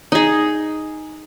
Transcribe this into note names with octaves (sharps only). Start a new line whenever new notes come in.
D#4 G#4